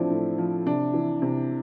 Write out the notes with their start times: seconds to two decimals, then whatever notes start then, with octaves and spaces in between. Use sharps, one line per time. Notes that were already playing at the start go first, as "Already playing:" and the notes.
Already playing: A2 F3 C4 D4 E4
0.10 A2
0.38 F3
0.66 C3 D4
0.94 E3
1.22 C3